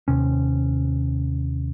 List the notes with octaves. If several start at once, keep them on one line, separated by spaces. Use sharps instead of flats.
D#2 C3 C#4